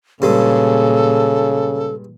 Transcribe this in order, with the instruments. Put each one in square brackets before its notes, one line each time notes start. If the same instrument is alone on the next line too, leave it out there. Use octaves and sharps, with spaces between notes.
[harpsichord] G2 G#3 [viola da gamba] A#2 [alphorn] C#3 [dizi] A4